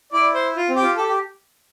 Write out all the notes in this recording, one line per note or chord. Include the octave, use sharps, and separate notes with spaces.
E4 D5
C5
F4
C4
G4
F4
G4 A4
G4